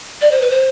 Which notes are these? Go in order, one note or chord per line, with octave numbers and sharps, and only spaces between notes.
D5
C5
B4
C5